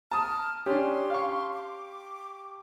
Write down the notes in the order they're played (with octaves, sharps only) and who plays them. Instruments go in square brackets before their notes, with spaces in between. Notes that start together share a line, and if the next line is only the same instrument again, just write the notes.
[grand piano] A5 D#6 [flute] F6
[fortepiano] C#4 D4 [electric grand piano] G4 [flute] C6
[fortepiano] F5 C#6
[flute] D6